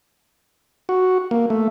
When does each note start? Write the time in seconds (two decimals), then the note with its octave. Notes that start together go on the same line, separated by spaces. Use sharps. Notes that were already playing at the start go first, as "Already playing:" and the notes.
0.89 F#4
1.31 A#3
1.50 A3